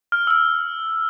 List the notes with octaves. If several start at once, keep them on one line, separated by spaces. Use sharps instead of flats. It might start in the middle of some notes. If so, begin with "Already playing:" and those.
F6
E6
F6